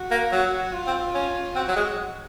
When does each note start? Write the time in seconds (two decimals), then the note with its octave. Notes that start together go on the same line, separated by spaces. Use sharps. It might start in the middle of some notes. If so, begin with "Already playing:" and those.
Already playing: F#4
0.11 A#3
0.32 F#3 F#4
0.73 F4
0.87 C4
1.14 C#4
1.56 C4 F#4
1.68 F#3
1.76 G#3